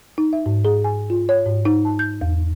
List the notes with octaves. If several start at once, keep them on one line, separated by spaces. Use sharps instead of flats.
D#4
E5
G#2
G#4
G#5
F4
C#5
G#2
D#4
A5
G6
E2